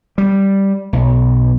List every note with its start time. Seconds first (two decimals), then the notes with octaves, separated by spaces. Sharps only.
0.18 G3
0.93 B1